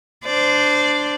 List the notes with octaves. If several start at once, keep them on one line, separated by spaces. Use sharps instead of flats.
D4 C5 D5